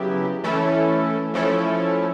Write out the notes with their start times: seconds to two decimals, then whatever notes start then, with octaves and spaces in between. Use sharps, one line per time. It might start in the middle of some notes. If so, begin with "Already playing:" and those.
Already playing: C#3 F#3 B3 E4 G4
0.44 E3 A3 C#4 E4 A4
1.34 F3 A3 C#4 E4 A4